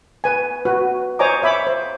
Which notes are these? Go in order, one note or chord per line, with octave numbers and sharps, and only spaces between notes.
B4 G#5
F#4 B4
C5 C#5 D#5 G#5 A#5 D6
C#5 E5 B5 D6
C5